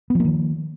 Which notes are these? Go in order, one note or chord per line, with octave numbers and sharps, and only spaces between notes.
D#3 F3 A#3 B3